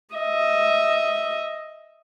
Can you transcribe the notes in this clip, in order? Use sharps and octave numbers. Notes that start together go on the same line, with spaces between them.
D#5 E5